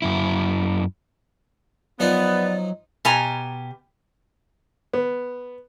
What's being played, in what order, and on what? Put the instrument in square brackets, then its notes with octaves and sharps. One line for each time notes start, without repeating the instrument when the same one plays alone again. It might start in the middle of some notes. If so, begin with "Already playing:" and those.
[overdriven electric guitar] F#2 E4
[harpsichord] F3 D#4 F4 [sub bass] F#3 [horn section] B3 [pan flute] D5
[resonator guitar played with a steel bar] B2 G4 G#5 A#5
[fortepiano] B3